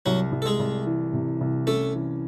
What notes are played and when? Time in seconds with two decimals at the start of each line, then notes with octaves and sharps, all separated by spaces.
0.06 C2 F#3 F#4
0.32 C2
0.42 A4
0.46 G#3 G#4
0.59 C2
0.86 E3
1.13 C3
1.41 C2
1.67 A3 C#4 A4
1.95 E3